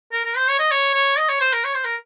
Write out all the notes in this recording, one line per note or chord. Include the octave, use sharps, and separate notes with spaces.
A#4
A#4
C5
C#5
D#5
C#5
C#5
D#5
C#5
C5
A#4
C#5
C5
A#4